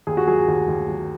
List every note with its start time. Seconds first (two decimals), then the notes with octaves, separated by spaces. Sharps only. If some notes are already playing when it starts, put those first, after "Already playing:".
0.07 D#2 G#4
0.17 F#4
0.27 F#3 G#4
0.48 D#2
0.68 D#2
0.89 F#3